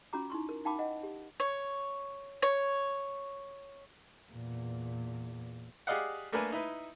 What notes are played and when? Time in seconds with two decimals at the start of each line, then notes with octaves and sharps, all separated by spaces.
0.13 C#4 F4 F#4 A#5 D6
0.30 D#4 E4 C6 C#6
0.49 A#4
0.65 D#4 F5 G5 A5 B5 D6
0.79 D#5 F#5
1.03 G4
1.40 C#5
2.42 C#5
4.31 E2 A#2
5.87 G4 G#4 D5 D#5 F5 F#5
6.32 A3 A#3 D4 A#4 B4 G#5
6.52 D#4 E4 B4